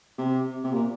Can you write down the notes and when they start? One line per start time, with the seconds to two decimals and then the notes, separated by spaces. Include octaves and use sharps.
0.18 C3
0.63 C3
0.72 A#2